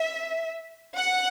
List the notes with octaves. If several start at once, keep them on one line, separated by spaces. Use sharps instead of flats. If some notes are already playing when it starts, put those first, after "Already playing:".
Already playing: E5
F#5